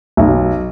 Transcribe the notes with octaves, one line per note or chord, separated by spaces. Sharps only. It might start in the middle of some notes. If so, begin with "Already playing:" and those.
B1